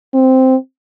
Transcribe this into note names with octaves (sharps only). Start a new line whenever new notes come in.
C4